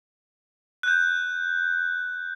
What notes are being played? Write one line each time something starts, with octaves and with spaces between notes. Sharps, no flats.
F#6 G6